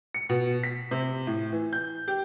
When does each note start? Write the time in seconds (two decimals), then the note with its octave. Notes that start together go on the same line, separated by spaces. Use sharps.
0.14 C#7
0.29 B2
0.63 B6
0.91 C3
1.27 A2
1.52 E3
1.73 G6
2.08 G4